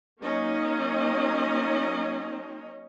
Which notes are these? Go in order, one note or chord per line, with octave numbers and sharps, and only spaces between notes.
F#3 A#3 C#4 D#4 C#5 D#5